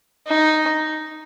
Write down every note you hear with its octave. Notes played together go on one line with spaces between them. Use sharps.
D#4